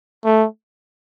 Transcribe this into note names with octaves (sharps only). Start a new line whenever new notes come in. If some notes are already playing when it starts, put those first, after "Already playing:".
A3